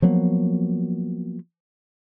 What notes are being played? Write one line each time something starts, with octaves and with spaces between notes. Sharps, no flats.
F3 F#3 A#3 B3